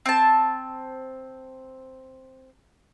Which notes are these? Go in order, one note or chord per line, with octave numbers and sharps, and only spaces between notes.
C4 A5